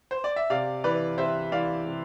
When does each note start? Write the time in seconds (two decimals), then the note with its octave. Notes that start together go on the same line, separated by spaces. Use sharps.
0.11 C5
0.24 D5
0.36 E5
0.50 C3 D5 F5
0.84 E3 B4 D5
1.18 C3 C5 E5
1.52 E3 D5 F5
1.86 C3